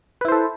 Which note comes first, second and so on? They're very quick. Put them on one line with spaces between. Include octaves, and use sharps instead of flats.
B4 E4 C5 A4